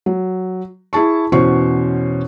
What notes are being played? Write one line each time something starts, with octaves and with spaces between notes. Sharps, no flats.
F#3
E4 G#4 A5 C#6
E2 B2 C#4 C5 C#5 C#6